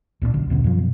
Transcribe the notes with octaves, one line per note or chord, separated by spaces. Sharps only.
C#2 A#2 G3 D4
B1 D3
D#2 B2 D3 C#4
F#2 F3
B2